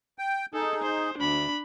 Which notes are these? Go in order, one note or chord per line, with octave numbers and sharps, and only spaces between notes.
G5
D#4 G#4 A4
C5
D2 D4 B5